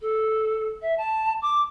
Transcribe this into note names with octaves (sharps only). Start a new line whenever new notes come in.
A4
E5
A5
D6